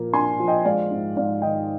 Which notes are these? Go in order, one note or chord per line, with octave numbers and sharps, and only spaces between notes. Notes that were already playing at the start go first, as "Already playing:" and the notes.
Already playing: A#2 F3 A#3
D4 G#5 C6
F3
D#5 G5
G#3 D5 F5
G#2
G#2 D5 F5
D#3 D#5 G5